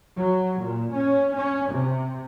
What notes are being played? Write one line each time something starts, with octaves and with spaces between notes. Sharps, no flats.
F#3
A#2
C#4
C#4
C3